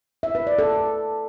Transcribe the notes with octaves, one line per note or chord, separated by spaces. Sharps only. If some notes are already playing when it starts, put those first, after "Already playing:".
E5
B4
D5
A4